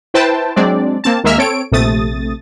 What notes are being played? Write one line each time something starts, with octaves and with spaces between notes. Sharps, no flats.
E4 B4 C5 G5 A5
F#3 G#3 C4 D4 D5
A#3 C4 A5
D#2 G#3 A#3 E5 F6
C4 A4 C#5 D7
A#1 C3 A3 D#6 A6